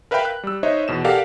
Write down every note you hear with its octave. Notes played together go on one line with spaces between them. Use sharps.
A#4 B4 E5 F5 G5 B5
F#6
G3 E6
D#4 C5 C#5 D#5 E5
E2 B2 E7
G4 A4 A#4 D5 F5 F#5